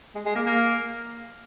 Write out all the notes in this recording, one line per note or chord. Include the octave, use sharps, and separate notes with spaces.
G#3
G#3
A#3
A#3